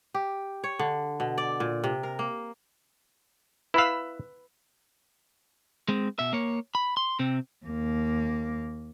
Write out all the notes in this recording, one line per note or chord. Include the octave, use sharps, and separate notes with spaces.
G4
C#5
D3
B2
D5
A#2
C3
A#4
A#3
E4 B4 F5 B5 E6
G#3 C4
B2 E5
A#3 C#5
B5
C6
C3 C4
D#2 A#3